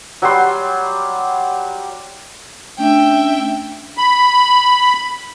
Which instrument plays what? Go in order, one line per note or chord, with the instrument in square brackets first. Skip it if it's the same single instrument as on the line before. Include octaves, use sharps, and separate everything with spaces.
[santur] F#3 G3 C6
[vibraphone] A3 C#4 D4 [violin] E5 G5
[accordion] B5